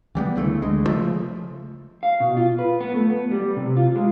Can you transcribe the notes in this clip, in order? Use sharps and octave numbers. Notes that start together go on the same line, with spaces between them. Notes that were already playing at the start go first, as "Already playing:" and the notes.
E3 G3 A#3 B3
D2 C#3 E3 A3
D2 G#3
C#3 F3 A3
F5
B2
F4
B4
B3
A3
B3
G3
C3
F4
G#3